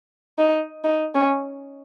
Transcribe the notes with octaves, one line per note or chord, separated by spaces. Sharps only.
D#4
D#4
C#4